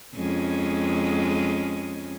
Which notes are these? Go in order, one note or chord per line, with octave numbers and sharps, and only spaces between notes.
F2 G#3 C#4